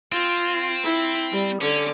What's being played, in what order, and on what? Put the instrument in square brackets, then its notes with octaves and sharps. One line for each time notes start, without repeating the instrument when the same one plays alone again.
[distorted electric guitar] C4 [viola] F4
[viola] E4 B5
G3
[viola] D3 D6 [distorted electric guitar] C#4